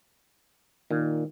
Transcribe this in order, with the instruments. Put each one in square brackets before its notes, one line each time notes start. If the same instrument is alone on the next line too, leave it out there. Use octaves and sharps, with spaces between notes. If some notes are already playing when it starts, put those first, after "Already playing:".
[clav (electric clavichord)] A#2 [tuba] D#3